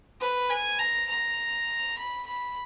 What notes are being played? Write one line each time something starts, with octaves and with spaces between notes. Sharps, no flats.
B4
G#5
A#5
A#5
B5
B5